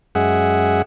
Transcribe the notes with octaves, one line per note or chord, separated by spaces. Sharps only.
F#2 G#3 G#4 E5 F#5